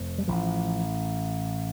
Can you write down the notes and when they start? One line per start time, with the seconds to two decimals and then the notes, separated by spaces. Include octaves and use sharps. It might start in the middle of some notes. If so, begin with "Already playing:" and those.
Already playing: F1 F2
0.18 G3
0.28 A1 D3 F3
0.32 A2